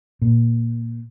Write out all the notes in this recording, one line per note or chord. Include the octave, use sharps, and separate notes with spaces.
A#2